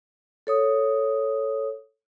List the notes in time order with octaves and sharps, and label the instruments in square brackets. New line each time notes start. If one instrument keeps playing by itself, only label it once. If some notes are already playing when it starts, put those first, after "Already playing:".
[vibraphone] A4 C#5 D#6